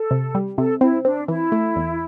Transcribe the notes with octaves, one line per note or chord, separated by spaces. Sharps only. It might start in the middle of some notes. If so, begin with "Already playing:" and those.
Already playing: A4
C3
G3
C3 A4
C4 E4
C4 D4
E3 E4
A3
E2